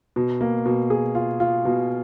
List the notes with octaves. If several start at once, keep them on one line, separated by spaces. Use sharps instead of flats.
B2
A#3
B2
G#4
F4
F4
B2